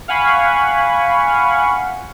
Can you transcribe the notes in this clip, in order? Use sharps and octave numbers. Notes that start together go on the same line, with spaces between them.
F5 F#5 G#5 B5 C#6